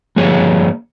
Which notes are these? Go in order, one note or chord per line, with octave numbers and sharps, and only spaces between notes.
G2 F3 A#3 G#4 C#5